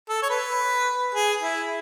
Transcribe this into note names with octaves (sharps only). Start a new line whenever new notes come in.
A4
C#5
B4
G#4
E4